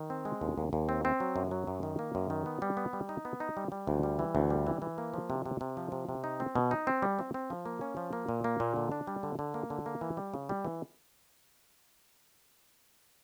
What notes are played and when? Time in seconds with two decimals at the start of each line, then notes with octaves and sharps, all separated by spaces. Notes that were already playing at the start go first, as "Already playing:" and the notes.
Already playing: D#3
0.10 C4
0.25 G#3
0.41 D#2
0.58 D#2
0.73 D#2
0.89 C4
1.05 C4
1.20 F#3
1.36 F#2
1.51 F#3
1.67 F#2
1.83 D#3
1.99 A#3
2.15 F#2
2.30 D#3
2.46 B3
2.62 G3
2.77 B3
2.93 G3
3.09 D#4
3.25 B3
3.40 D#4
3.57 G3
3.72 G3
3.87 D2
4.03 G3
4.19 E3
4.35 D2
4.50 G3
4.67 E3
4.82 E3
4.98 A#3
5.14 F3
5.30 C3
5.46 C3
5.61 C3
5.77 F3
5.92 C3
6.09 C3
6.24 D#4
6.40 C4
6.55 B2
6.71 D#4
6.87 C4
7.02 G3
7.19 C4
7.34 C4
7.50 F3
7.66 A#3
7.81 C#4
7.97 F3
8.13 A#3
8.29 A#2
8.44 A#3
8.60 A#2
8.76 D3
8.92 D4
9.07 G3
9.23 D3
9.39 D3
9.54 A#3
9.70 D3
9.86 A#3
10.01 E3
10.17 G3
10.34 C#3
10.49 G3
10.65 E3